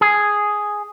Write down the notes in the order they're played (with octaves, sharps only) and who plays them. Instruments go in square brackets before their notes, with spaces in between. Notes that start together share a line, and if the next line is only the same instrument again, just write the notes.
[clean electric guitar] G#4